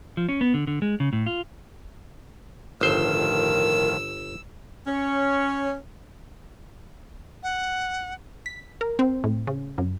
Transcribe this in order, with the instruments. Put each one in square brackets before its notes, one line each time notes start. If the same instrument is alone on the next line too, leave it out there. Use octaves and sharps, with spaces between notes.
[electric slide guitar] F3
C#4
B3
D3
D3
G#3
C#3
A2
F4
[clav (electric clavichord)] G1 C5 [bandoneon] A2 D#3 F3 [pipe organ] A#4 [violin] E6
[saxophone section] C#4 C#5
[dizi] F#5
[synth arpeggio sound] B6
A#4
C4
A2
C#3
F#2